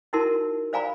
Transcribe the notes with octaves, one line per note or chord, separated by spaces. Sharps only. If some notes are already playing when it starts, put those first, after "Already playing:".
D#4 E4 F#4 A#4 A5 C6
C5 D5 F5 G#5 A#5 B5